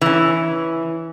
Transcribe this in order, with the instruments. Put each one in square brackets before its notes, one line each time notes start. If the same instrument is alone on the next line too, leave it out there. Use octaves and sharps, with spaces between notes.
[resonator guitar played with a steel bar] E3 C#4